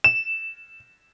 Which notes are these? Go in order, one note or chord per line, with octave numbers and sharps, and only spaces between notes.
E7